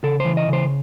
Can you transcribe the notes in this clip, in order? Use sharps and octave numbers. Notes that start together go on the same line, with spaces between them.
C#3 A4
E3 C5
D#5
C#3 C5